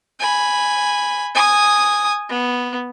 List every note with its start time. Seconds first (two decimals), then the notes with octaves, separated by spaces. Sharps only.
0.20 G#5 B5
1.35 G#5 D#6
2.29 B3